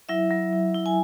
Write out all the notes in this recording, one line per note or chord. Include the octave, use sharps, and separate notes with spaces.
F#3 E4 E5
F#3
E4
E4
G#5